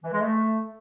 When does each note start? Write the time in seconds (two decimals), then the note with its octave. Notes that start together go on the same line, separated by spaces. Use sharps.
0.03 E3
0.12 G#3
0.21 A3